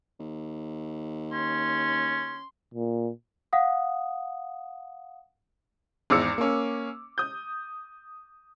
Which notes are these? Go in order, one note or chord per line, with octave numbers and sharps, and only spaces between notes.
D#2
C#4 C6
A#2
F5 F#5 D#6
G#1 E2 D6 E6 C#7
A#3 C#4
D#6 G6